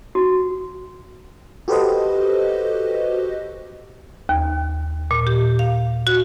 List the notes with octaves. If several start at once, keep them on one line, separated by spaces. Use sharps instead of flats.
F#4
F#4 G4 A4 B4 C5 D#5
D#2
A#2
G4
F5
F#4